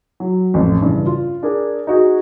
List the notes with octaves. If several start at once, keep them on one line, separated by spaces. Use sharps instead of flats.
F#3
A1 F2
G2 C#3 E3
F4
D4 G#4 A#4
D#4 F#4 G#4